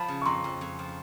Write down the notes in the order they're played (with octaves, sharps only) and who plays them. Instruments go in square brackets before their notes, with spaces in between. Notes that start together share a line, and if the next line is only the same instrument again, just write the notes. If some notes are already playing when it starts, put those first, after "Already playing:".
Already playing: [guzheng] F3 [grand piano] A5 B5
[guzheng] C#3
[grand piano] C#6
[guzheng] F2 [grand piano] A#5 C6
[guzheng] F2
F2
F3